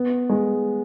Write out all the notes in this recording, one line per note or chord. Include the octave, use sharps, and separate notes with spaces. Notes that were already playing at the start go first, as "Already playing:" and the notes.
Already playing: B3
G#3